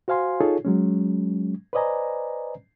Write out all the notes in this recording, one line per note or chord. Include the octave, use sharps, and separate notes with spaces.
F#4 C5 F5 G#5 C6
D#4 F4 G#4 A4 C#5
F#3 G#3 C#4
B4 C5 D5 D#5 G#5 A#5